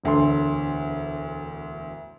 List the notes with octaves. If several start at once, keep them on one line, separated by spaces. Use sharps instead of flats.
E1 D2 A4 C6